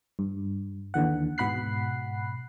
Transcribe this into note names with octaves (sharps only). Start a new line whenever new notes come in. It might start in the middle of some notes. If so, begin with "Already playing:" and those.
G2
D#2 D3 E3 F#5
G#2 B2 F#5 B5 F#6 C7